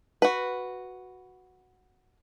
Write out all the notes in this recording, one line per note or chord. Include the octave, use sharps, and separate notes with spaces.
F#4 B4